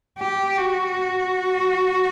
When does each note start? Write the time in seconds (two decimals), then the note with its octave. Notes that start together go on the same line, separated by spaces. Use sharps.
0.19 G4
0.58 F#4